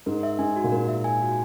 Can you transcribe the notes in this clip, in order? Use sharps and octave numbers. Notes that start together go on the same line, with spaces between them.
G#2 A#4
E5
G#2 G#5
F#4
A#2
G#2 A#4
E5
G#5
F#4